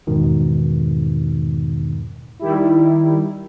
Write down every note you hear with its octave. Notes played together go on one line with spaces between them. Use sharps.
E2 G#2 B2 D#3
D#3 G3 E4